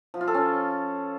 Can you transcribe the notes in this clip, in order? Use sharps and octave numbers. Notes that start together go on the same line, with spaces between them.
F3
F4
A4
C#4